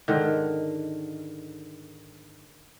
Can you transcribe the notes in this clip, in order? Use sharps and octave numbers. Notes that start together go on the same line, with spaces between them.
G#2 D3 D#3